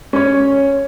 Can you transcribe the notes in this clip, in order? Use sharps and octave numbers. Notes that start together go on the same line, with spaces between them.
C#4 C#5